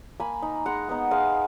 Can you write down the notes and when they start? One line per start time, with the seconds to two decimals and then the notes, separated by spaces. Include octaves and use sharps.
0.20 A#3 G#5 B5
0.42 D#4
0.66 G#3 F#5 A#5
0.89 B3 D#4
1.11 G#3 F5 G#5